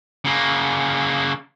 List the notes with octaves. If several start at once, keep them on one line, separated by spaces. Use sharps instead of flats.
C#3 A#3